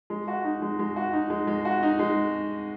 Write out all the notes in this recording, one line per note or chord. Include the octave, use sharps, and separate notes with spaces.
G#3
F#4
D#4
G#3
G#3
F#4
D#4
G#3
G#3
F#4
D#4
G#3